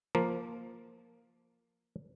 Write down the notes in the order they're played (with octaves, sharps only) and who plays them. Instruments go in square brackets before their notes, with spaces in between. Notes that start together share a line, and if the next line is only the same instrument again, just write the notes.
[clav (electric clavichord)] F3 A#3